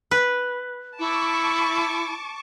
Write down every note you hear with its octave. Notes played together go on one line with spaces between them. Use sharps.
B4
E4 A5 C#6 D6